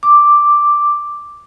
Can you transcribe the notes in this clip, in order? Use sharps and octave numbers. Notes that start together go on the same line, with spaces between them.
D6